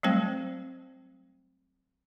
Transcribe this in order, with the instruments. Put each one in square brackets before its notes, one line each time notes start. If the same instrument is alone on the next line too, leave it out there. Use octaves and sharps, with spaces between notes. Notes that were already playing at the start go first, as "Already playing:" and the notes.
[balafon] F#3 G3 A3 C4 C5 G5